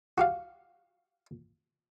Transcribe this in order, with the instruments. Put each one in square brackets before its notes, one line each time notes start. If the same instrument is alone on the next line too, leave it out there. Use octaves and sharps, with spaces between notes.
[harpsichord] F#4 G4 F5